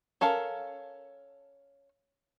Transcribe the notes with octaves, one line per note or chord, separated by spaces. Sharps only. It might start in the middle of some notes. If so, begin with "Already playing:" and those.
C#4 A4 A#4 F5